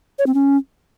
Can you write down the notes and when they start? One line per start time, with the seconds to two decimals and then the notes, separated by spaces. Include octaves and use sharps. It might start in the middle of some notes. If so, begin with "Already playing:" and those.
0.19 C#5
0.27 C4
0.34 C#4